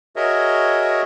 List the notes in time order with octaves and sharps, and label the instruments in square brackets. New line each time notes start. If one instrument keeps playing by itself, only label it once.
[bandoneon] F#4 G#4 A#4 C#5 D#5 E5